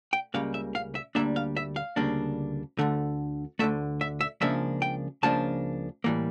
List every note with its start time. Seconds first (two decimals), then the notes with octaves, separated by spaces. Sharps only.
0.13 G5
0.34 C#2 C#3 G3 A#3 F5
0.54 E5
0.75 F5
0.95 E5
1.15 D2 C#3 G3 A#3 D4 E5
1.36 F5
1.57 E5
1.76 F5
1.96 D2 C#3 G3 A#3 D4
2.79 D2 D3 A3
3.59 D2 D3 A3 E5
4.01 E5
4.21 E5
4.41 C#2 C#3 F3 A#3 D4 E5
4.82 G5
5.23 C#2 C#3 F3 A#3 D4 A5
6.04 A2 E3 G3 A#3